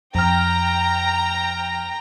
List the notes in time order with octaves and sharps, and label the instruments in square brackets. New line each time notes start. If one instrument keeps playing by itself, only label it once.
[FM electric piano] F2 F6 [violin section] G5 A#5